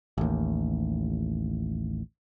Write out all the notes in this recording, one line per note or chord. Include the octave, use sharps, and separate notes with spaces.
A1 D#2